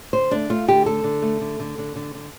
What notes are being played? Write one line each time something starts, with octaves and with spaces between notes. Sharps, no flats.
D3 C5
A3 D4
A3 F4
D3 G4
A3 A4
D3
A3
D3
D3
D3
D3
D3